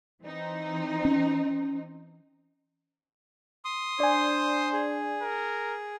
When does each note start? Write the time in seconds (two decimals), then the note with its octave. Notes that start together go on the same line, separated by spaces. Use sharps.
0.22 E3 C4 D#4
1.05 C#4
3.65 C6 D#6
4.00 D4 C5 D5 G#5
4.73 G#4
5.22 A#4